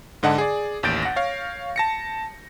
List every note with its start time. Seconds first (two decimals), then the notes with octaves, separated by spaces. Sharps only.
0.23 G#2 D3 D#5 F#5 A5
0.38 G#4 D5
0.83 A1 D#2 G6 A6 D7
1.02 F#5 A#6
1.16 C#5 F5
1.76 A5 A#6 C#7